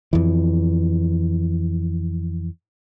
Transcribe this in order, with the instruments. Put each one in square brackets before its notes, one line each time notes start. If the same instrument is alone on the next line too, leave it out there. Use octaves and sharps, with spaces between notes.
[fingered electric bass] F2 E3